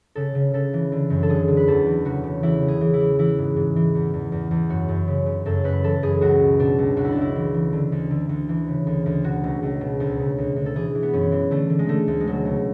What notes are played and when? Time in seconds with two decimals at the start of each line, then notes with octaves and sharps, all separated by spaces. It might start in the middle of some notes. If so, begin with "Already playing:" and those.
0.15 C#3 A4
0.35 C#3
0.53 C#3 A4
0.73 E3
0.92 D3
1.10 F#2
1.23 A4
1.29 D3 G#4
1.48 D3
1.57 B4
1.67 E2 A4
1.86 E3
2.05 C#3 F#4
2.24 C#3
2.43 E3 E4
2.62 C#3
2.68 G#4
2.81 E3
2.93 E4
3.00 E3
3.19 E3 E4
3.38 G#2
3.56 G#2
3.76 E3
3.95 E2
4.14 E2
4.32 E2
4.51 E2
4.70 F#2 F#4
4.89 F#2
5.08 C#3
5.26 C#3
5.46 F#2 A4
5.64 F#2 B4
5.84 E3 A4
6.03 F#2 G#4
6.21 C#2 F#4
6.40 B2
6.59 B2 D4
6.79 C#2
6.97 C#2 F#4
7.05 E4
7.12 C#2 D4
7.21 E4
7.36 E3
7.54 E3
7.73 D3
7.92 D2
8.11 D3
8.29 D2
8.49 E3
8.68 C#3
8.87 D2
9.06 D2
9.23 B2 F#4
9.44 C#2
9.63 C#2
9.81 B2
10.00 D2
10.19 C#3
10.38 D2
10.56 D2
10.66 A4
10.75 E3 G#4
10.95 E3
11.03 B3
11.13 F#2 C#4
11.32 E3
11.51 D3 A3
11.70 D3
11.79 G#3
11.88 D3 A3
12.08 D2
12.20 G#3
12.27 B2 F#3
12.45 C#2